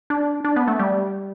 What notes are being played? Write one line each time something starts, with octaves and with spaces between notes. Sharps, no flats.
D4
D4
B3
A3
G3